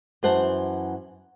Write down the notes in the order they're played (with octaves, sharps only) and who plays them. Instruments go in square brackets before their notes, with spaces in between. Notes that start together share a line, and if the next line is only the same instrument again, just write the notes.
[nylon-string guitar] F#2 E3 C5 F#5 A5